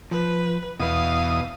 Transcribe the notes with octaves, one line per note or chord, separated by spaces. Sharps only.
F3 B4
E2 B2 B4 F5 D#6